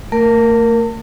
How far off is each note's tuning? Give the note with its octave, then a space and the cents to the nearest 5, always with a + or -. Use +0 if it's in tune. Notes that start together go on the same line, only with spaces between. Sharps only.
A3 +40 A#4 +0